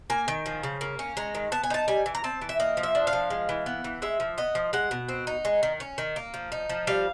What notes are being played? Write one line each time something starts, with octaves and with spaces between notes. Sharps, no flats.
A#3 G#5
D#3
F3
C#3
A#3
C#4
G#3 A#5
D#3
B3 A5
G#5
D#4 A5
G3 G#5
E3
A#5
C4 A5
E3
E5
A#3 D#5
F3
E5
D4
F5
F3
G#3
E3
B3
E3
G#3 E5
F3
B3 D#5
F3
G#3 F#5
B2
C4
D#4
G#3
D#3
C#4
D#3
A#3
F3
D#4
F3
G3 F5